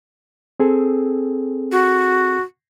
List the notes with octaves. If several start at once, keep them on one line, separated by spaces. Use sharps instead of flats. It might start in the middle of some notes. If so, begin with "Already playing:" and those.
C4 G#4 A4
F#4